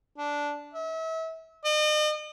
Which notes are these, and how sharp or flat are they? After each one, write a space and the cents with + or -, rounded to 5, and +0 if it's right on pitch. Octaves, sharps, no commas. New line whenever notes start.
D4 -10
E5 -35
D#5 -40